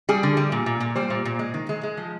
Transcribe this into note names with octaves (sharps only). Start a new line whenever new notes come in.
G3 G#4
D3
G3
A#2
A#2
A#2
G3 C5
A#2
A#2
G#3
D#3
G#3
G#3
F3